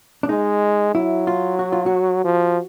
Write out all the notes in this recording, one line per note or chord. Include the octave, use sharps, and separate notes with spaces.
D4
G#3 D#4
F#3 E4
F4
F#4
F4
F#4
F3